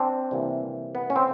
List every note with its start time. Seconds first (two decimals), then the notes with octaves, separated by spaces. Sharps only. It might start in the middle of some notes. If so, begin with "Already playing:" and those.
Already playing: C4 D4
0.31 C3 E3 G3 A#3
0.95 B3
1.10 C#4
1.16 C4